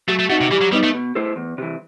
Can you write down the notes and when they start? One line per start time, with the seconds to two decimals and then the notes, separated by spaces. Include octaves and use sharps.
0.08 F#3 A3
0.19 A3
0.29 A3 C4 D#4 F#4
0.41 C3
0.51 E3 G3
0.61 F#3
0.72 G3 B3 D#4
0.83 A3
0.94 B2
1.15 A3 E4 A4 C5
1.36 E2
1.58 C3 E3